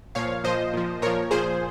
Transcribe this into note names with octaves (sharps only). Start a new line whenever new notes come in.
A#2 F3 C#5 F5
A#2 F3 C5 D#5
A#2 F3
A#2 F3 A#4 C#5
A#2 F3 G#4 C5